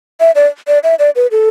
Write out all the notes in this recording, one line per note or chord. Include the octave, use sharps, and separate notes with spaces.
E5
D5
D5
E5
D5
B4
A4